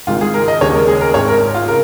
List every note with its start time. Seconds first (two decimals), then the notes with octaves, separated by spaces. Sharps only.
0.07 G#1 G#2 D#3 F4
0.21 G#4
0.34 A#4
0.48 D#5
0.61 D#2 C#3 G#3 C#5
0.75 A#4
0.88 G#4
1.01 A#4
1.14 G#1 G#2 G#3 C#5
1.28 A#4
1.54 F4
1.68 C#3 A#4